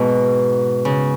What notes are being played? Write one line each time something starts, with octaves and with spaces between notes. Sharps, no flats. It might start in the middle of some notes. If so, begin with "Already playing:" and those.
Already playing: G#2 B2
C#3